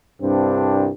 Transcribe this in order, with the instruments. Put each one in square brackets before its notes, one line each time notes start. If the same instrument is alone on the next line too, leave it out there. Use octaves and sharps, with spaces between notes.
[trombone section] C2 G2 C4 D4